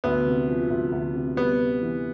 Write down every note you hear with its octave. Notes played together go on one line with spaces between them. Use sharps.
D2 B3
C3
F3
D2
D2
C3
G3 B3
C3
E3